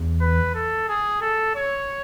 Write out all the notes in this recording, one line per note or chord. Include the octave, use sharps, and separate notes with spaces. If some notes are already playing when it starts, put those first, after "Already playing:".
Already playing: E2
B4
A4
G#4
A4
C#5